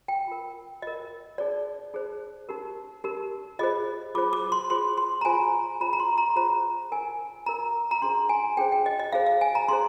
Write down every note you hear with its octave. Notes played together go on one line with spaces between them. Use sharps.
G5
F4 A#4
F4 A#4 D#5
D#4 G#4 C5 D5
D#4 G#4 C5
D#4 G4 A#4
D#4 G4 A#4
F4 G#4 C5 D#5
F4 G#4 C5 D6
D6
C6
F4 G#4 C5 C6
C6
A#5
F4 G#4 C5 G#5
F4 G#4 C5 A#5
A#5
C6
A#5
F4 G#4 C5 A#5
D#4 A#4 G#5
D#4 A#4 A#5
A#5
D4 G#4 C5 C6
G#5
D4 G#4 C5 G5
G5
D#5
D#5
D#4 G#4 C5 F5
F5
G#5
A#5
D#4 G#4 C5 C6